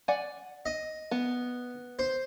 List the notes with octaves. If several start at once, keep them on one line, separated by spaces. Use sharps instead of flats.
D5 F#5 G#5
D#5
B3
C5